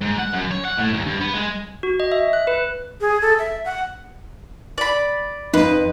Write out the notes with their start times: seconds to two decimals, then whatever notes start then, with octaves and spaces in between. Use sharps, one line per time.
0.02 G#2
0.19 F#5
0.33 F#2
0.51 C#5
0.65 F#5
0.78 A2
0.94 D#2
1.06 G2
1.21 B3
1.34 G#3
1.83 F#4
2.00 D#5
2.12 E5
2.33 F#6
2.47 B4
3.01 G#4
3.21 A4
3.39 E5
3.65 F#5
4.78 D5 B5
5.54 F2 D#4 B4